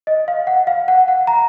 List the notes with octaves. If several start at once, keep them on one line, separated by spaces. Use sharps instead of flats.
D#5
F5
F#5
F5
F#5
F#5
A#5